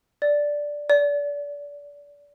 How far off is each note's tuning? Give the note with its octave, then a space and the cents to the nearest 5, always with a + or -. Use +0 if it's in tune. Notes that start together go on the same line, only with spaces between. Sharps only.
D5 +0
D5 -25